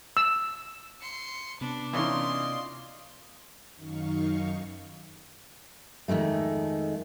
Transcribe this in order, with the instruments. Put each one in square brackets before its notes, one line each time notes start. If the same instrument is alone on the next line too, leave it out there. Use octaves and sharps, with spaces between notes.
[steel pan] E6
[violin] C6 C#7
[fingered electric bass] C3 B3 [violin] D4 [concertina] B5 D6
[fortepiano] E3 C#4 D#4 [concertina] F4 D5 D#5 [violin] C6
[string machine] F#2 D#3 D#4 F5 C#6
[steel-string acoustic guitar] F2 D#3 F3 G#3 A3